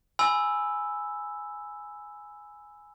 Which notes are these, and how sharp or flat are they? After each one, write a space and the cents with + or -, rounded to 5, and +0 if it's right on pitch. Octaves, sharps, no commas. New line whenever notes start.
G#5 +0 B5 +10 E6 +0